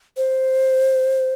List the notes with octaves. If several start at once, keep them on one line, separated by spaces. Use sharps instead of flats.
C5